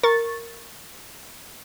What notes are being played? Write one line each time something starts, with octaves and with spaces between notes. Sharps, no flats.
A#4 C#6 A6